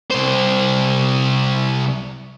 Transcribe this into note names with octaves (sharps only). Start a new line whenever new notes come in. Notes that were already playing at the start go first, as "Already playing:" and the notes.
C2 C5